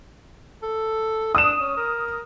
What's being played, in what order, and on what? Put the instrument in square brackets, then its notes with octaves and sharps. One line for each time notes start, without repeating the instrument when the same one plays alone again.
[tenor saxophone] A4
[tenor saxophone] D4 [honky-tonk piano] D#6 E7
[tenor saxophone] C#4
A#4